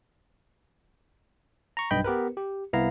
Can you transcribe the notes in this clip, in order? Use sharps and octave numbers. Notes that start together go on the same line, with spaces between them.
A#5 C#6
B1 G2 D#5 G5 B5 G6
B3 G4 A#4 B4
G4
C2 B3 E4 F5 A#5